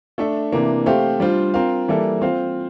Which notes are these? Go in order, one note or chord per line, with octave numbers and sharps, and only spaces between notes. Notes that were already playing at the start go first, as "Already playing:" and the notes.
A3 D4 A4 E5
C3 E3 A#3 D4
A3 C4 G4 C5 F5
G3 D4 F4 C5
C4 F4 A#4 F5
E3 G3 A#3 E4 A4
C4 F4 C5 F5